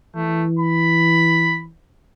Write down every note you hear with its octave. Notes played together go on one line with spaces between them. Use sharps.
E3 A3
B5